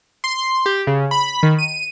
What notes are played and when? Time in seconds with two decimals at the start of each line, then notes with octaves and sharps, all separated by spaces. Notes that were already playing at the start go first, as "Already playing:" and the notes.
0.24 C6
0.66 G4
0.87 C#3
1.11 B5
1.43 D#3
1.58 D#7